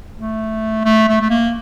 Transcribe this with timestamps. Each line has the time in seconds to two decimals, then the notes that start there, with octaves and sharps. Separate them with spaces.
0.18 A3
0.85 A3
1.09 A3
1.21 A3
1.30 A#3